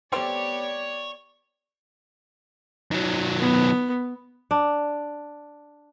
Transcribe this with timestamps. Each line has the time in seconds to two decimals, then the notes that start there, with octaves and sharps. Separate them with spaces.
0.13 G3 A3 B3 C4 G4 C#5 D5
2.91 D#3 F#3
3.38 B3
4.51 D4